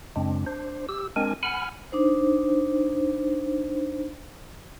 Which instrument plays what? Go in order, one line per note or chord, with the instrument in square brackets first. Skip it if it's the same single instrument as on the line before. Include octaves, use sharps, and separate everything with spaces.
[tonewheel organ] F#2 C#3 G#3 C4 D4
D4 C5
G4 E6
G#3 C4 D4 A#4 G#5
F#5 G#5 B5 F6
[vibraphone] D4 D#4 C5